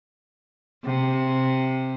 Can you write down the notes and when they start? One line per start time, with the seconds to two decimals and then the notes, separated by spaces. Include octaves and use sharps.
0.84 C3